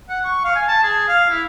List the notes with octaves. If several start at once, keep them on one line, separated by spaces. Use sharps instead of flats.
F#5
C#6
F5
G#5
A5
G#4
F5
E4